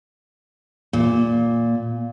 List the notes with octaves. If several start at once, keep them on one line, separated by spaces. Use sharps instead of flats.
A#2